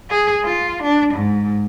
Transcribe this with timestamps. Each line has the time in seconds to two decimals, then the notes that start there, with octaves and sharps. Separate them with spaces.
0.10 G#4
0.44 F4
0.83 D4
1.14 G#2